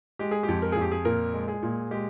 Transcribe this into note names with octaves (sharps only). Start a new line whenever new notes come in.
G#3 G4
G#4
G4
F2
A#4
F2 G#4
G4
G#4
A#2 A#4
G#3
G#4
A#2
G#3 G4